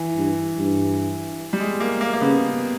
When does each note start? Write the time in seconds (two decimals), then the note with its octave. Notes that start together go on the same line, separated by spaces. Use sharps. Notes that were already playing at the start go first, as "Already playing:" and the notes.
Already playing: E3
0.17 G2
0.57 G2
1.53 G3
1.60 G#3
1.80 A#3
2.01 A#3
2.13 A#3
2.21 C#3 B3